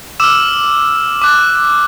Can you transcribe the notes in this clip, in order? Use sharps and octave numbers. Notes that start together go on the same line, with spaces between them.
D6 E6 F6 E7
D6 F#6